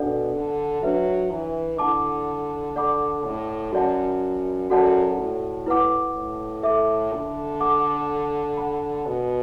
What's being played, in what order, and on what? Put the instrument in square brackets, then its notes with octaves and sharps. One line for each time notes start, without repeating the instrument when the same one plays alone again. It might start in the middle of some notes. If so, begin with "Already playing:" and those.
Already playing: [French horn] B2 [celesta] D4 A4 D5 F#5
[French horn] D3
[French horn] F#3 [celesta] D4 B4 E5
[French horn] E3
[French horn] D3 [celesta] E4 A4 F#5 A5 D6
[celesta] A4 D5 F#5 B5 D6
[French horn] A2
[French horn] F#2 [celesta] F#4 D5 F#5 A5
[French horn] F#2 [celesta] F#4 A4 D5 F#5 A5
[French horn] A2
[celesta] E4 B4 F#5 D6
[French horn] A2
[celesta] A4 E5 D6
[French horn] D3
[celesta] A4 F#5 D6
A4 F#5 B5
[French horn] B2